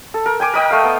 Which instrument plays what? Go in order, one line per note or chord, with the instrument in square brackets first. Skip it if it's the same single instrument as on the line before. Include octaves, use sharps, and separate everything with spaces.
[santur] A4
A#4
G5 G#5 D6
A#4 D#5 G5
A3 F5
B3